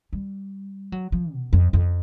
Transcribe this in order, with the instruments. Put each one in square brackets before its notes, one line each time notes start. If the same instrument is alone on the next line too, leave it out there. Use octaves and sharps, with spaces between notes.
[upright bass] G3
F#3
F3
B2
F2
F2